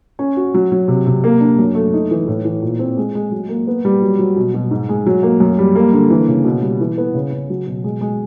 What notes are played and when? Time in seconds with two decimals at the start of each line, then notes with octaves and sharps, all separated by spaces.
0.19 C#4
0.37 F#4
0.54 F#3
0.72 F#3
0.88 C3
1.07 C3
1.24 A#3
1.40 D4
1.59 F#2
1.75 A3
1.93 D#4
2.11 E3
2.28 A2
2.44 E3
2.62 A#2
2.79 C4
2.97 G#3
3.15 G#3
3.31 F#3
3.49 A#3
3.67 B3
3.85 G3
4.02 F#3
4.19 F#3
4.36 B2
4.54 B2
4.71 G#2
4.89 G#3
5.06 F#3
5.23 A#3
5.40 F#2
5.58 G3
5.76 A#3
5.93 D3
6.10 E3
6.28 C#3
6.44 B2
6.62 G3
6.80 E3
6.98 B3
7.14 C#3
7.32 C#3
7.50 F#3
7.67 B2
7.84 G#3
8.01 G#3